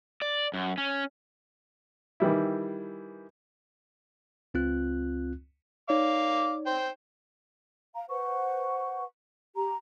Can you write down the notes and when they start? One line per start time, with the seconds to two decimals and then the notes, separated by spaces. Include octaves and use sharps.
0.22 D5
0.54 F#2
0.78 C#4
2.20 D#3 E3 G3 E4
4.54 C#2 C4 F4 F#6
5.89 D#4 C#5 D5 F5 D6
6.66 C5 G5
7.95 F5 A#5
8.09 B4 C5 F#5 C#6
9.55 G4 A#5